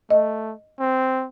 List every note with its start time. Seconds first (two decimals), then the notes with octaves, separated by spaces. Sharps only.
0.11 A3 D#5
0.79 C4